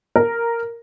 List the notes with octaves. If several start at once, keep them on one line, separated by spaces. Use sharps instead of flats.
A#4